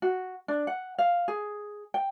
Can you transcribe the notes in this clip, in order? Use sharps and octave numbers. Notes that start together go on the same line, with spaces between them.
F#4
D4
F#5
F5
G#4
G5